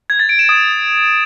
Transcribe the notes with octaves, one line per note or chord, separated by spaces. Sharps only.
G#6
A6
D7
E7
D#6